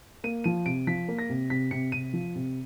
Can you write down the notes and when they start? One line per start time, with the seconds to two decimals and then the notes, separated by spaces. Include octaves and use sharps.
0.24 A#3 D#7
0.44 F3 D#7
0.66 C3 D7
0.87 F3 B6
1.08 A#3
1.19 A#6
1.30 C3
1.50 C3 B6
1.71 C3 C#7
1.92 C3 D#7
2.13 F3
2.36 C3